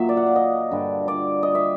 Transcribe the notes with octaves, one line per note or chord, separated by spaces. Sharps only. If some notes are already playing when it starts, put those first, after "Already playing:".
Already playing: A#2 F#3 E5
D5
F#5
F5
D#5
G2 D3 G3
D5
D#5
E5